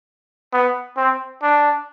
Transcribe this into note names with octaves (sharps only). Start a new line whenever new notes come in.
B3
C4
D4